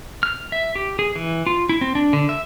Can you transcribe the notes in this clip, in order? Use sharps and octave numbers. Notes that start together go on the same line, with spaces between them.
F6
E5
G4
G#4
E3
F4
E4
C4
D4
D3
E5